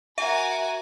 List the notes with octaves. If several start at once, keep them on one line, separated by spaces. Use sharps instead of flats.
F#4 A#4 E5 G#5